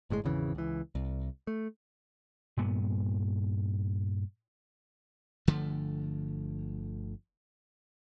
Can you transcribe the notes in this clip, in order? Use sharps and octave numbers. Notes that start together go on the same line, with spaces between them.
G1 A2 C3 G#3
G#1 E2 C#3 E3
C#2 E3
C2
A3
G2 A#2 B3
G1 D3 F3 A3